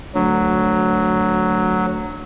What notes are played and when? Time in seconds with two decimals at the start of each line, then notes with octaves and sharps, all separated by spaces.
0.15 D2 F#3